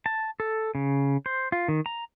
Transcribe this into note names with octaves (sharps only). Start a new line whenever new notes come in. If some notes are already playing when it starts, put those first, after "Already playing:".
A5
A4
C#3
C5
F4
D#3
A#5